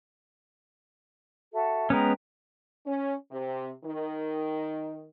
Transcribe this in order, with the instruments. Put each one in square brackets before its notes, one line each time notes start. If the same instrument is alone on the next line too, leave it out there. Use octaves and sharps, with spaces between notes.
[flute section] F#4 A4 E5
[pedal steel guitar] G#3 B3 C#4 [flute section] B4 G5 A#5
[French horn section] C#4
C3
D#3